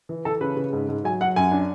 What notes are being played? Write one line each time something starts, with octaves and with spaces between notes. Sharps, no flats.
E3
E3 A4
C#3 B4
C#3
G#2
G#2
F#3 G#5
F#3 F#5
F#2 G#5
D4